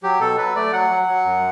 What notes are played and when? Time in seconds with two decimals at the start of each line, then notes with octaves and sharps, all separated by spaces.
0.03 F#3 G4
0.20 B2 A4
0.37 F#3 B4
0.55 A3 D5
0.73 F#3 F#5
0.90 F#3
1.08 F#3
1.25 F#2